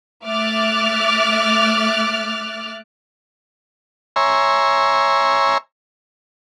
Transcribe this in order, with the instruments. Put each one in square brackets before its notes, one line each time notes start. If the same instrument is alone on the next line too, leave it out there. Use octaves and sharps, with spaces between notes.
[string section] A3 E5 D6 F6 F#6 A6
[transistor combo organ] C#5 E5 G#5 A#5 C6